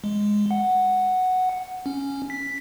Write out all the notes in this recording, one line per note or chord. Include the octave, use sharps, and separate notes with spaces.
G#3
F#5
C#4
B6